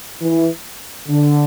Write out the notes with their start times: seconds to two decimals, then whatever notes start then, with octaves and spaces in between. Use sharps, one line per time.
0.22 E3
1.09 D3